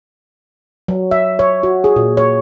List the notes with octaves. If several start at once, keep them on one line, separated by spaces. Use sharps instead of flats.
F#3
E5
C#5
F#4
G#4
A#2
C#5